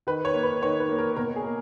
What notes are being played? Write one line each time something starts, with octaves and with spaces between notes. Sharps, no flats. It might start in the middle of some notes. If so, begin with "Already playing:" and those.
D#3 B4
C#5
A#3
B4
D#3 C#5
B4
A#3
A#4
B2 A#4
G#4
A#3